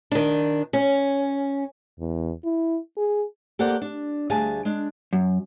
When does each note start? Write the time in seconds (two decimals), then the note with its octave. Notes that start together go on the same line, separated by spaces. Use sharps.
0.11 D#3 D4
0.73 C#4
1.99 E2
2.45 E4
2.97 G#4
3.59 A#3 G4 A4 C5 D5 F#5
3.82 D4
4.30 D2 G3 G#4 F5 G#5 A5
4.65 G#3 D4
5.13 F#2